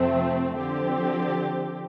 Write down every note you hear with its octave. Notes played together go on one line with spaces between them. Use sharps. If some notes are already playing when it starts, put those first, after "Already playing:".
Already playing: F2 C3 F3 A3 C4
D3 F3 C4 G4